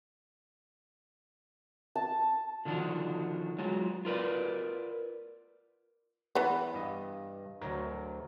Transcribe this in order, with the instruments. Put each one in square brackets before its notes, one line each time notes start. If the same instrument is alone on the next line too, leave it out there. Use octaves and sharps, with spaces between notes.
[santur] A5
[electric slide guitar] D3 D#3 F3 D4 F#4
F#3 G#3 F4
F4 A#4 B4 D5
[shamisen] E3 B3
[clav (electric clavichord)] G2 D#5
D2 F#3 A#4